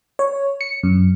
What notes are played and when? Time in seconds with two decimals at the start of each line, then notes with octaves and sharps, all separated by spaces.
0.19 C#5
0.61 C#7
0.83 F#2